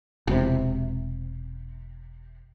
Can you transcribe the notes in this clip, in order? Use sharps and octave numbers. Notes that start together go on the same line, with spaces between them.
E1 C3